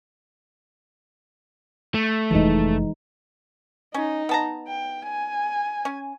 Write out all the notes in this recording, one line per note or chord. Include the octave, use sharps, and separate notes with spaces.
A3
F1 F2 E3 G#3 D#4
C#4 D#4
B3 A5 A#5
G5
G#5
C#4